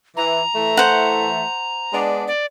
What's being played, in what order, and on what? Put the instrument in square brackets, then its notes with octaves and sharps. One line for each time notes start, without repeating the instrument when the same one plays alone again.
[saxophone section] E3 [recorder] A#5
[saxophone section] E3 A3
[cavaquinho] C5 F#5
[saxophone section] G#3 B3 D4
[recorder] D5